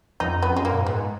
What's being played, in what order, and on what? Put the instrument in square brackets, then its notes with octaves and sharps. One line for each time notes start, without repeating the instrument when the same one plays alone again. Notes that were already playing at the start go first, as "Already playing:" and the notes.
[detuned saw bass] F2 [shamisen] D#4
[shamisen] B3
[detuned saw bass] F#2
[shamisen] G#3
A#3
[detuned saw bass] A#2
G#2
[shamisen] B3